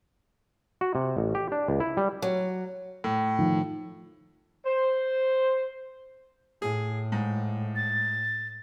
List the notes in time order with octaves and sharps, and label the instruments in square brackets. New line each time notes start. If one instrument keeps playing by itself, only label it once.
[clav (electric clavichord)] F#4
C3
A1
G4
D4
C#2
E4
G3
[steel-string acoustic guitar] F#3
[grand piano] A2
[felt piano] D#3 F3
[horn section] C5
[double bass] A2 [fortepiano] G#4
[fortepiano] G#2
[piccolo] A6